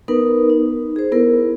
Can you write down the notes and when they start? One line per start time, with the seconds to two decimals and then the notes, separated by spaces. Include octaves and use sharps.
0.08 B3 D#4 A#4 B4
0.50 D#4
0.96 G#4 C5
1.12 B3 E4 A4 A#4